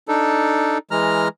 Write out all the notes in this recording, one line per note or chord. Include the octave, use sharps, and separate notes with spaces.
D4 D#4 A4
E3 G#3 A#5 F6